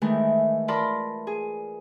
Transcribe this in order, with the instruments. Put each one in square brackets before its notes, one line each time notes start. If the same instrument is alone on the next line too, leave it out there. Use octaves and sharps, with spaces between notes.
[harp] D#3 E3 G#3 A3
F4 A#4 D5 A5 B5 C6
G#4